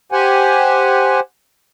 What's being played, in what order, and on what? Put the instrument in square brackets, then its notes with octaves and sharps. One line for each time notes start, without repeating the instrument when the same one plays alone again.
[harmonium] G4 C5 F#5 G#5